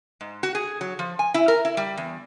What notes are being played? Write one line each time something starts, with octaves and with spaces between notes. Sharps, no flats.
G#2
F#4
G#4
F#3
F3
G#5
E4
A#4
E4
G3
E2